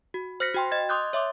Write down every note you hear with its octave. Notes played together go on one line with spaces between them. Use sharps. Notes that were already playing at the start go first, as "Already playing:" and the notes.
F#4
C5 F6 F#6 A#6 B6 C#7
F#4 G5 C6
D#5 G#6 A6
C6 D6 D#6 F#6 G6
C#5 E5 C6 D6